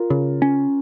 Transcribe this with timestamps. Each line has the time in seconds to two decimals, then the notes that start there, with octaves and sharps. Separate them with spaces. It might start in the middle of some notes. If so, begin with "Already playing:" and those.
Already playing: F4 A#4
0.10 C#3
0.42 C#4